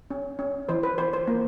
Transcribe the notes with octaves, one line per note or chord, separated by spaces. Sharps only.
C#4
C#4
E3 C5
B4
E3 C5
C5
A#3